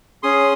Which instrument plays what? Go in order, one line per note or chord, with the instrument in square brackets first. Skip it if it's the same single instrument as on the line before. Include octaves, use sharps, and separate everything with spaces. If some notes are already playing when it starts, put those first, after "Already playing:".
[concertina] C#4 G#4 C6 D#6